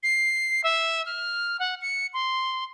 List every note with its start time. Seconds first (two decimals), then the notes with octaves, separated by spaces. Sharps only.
0.03 C7
0.64 E5
1.06 F6
1.60 F#5
1.82 C#7
2.14 C6